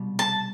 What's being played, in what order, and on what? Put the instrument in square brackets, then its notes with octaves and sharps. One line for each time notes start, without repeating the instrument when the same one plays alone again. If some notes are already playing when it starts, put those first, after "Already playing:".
Already playing: [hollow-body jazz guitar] C2 B2 G3
[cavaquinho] A5